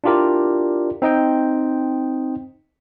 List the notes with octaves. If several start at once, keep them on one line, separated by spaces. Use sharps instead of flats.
D4 E4 F4 G4 A#4 D5
C4 D#4 D#5 G5